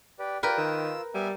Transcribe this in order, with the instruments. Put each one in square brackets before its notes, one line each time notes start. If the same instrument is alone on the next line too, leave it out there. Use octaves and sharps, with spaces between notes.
[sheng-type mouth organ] G4 B4 D5
[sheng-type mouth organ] F4 G4 D5 [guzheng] A#4 B4 G5
[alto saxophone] D#3 [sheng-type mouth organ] F4 E6
[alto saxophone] G3 [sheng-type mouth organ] B3 E5 G#5